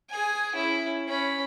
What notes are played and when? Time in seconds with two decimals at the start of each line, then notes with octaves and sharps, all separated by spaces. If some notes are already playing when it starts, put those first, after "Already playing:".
0.10 G#4 G#5
0.55 C#4 E4
1.08 C#4 B5